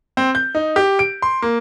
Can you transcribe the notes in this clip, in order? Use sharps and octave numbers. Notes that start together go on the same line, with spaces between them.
C4
G6
D#4
G4
D7
C6
A#3